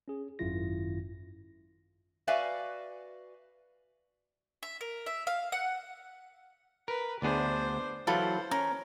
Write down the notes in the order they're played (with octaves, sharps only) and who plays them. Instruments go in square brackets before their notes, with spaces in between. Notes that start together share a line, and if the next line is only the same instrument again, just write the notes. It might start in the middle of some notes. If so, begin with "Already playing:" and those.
[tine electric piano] C#4 G#4
G#1 F#2 D#3 E4 F4 A#6
[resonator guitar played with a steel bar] F#4 B4 D5 E5 F5 G#5
[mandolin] E5
A#4
E5
F5
F#5
[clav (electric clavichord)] A#4 [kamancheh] B4
[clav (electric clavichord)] D2 B3 G#4 [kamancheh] D4 C5
[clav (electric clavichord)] E3 F#3 [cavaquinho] F4 A4 B5 [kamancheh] C5
[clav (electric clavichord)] C#4 [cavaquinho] A#4